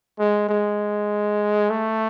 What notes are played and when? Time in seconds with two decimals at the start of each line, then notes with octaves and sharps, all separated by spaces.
0.19 G#3
0.49 G#3
1.70 A3